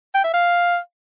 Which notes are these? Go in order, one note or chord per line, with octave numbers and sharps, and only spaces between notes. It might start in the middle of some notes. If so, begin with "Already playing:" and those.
G5
E5
F5